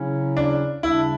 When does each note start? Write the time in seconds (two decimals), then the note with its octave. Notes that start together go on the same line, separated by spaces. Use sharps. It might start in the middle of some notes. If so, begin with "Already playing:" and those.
Already playing: C#3 F#3 C#4 E4
0.37 D4
0.83 C#3 G3 D4 E4